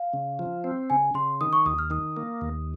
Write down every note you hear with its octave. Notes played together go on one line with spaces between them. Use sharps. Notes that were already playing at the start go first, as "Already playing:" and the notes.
Already playing: F5
C#3
F3
C4
C#3 G#5
C#3 C6
D#3 D#6
C#6
D#2 D#6
F6
D#3 D#6
A#3
D#2